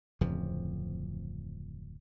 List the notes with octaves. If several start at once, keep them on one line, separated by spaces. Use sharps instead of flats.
D1 F2 C#3 F3